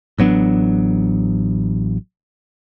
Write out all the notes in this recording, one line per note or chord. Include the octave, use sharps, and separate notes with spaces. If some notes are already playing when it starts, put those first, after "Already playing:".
A1 F#3 B3 D4